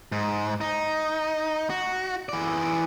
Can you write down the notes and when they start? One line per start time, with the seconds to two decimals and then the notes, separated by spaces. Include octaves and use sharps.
0.12 G#2
0.61 D#4
1.70 F#4
2.29 E3 D5